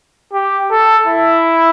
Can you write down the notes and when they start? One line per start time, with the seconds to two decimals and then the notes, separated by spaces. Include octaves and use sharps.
0.33 G4
0.71 A4
1.07 E4